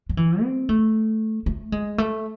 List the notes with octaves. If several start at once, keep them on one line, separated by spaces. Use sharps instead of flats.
F#3
E3
C4
A3
A3
G#3
A3